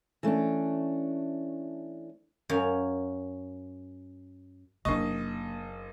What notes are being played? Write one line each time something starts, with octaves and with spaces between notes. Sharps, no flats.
E3 A3 C#4 D4
F#2 C#5 F5
F#1 C3 A#3 D4 D#5 C#6